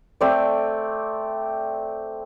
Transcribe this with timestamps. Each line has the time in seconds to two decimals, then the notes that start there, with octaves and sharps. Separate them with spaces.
0.21 A3 C4 D5